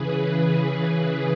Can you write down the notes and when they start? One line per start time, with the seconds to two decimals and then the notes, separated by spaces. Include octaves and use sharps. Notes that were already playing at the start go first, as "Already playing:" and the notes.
Already playing: C#3 E3 G#4 B4
0.26 C#3 E3